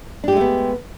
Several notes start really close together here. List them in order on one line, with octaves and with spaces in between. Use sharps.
D4 G4 G#3 A3 B3